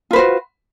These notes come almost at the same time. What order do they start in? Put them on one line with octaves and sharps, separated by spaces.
F4 B4 C5 F#4